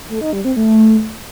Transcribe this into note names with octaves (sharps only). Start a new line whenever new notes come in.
A3
D#4
G3
C4
A3